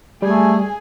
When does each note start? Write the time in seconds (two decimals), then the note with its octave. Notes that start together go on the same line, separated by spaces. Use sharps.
0.22 G3 A3 G#4 G#5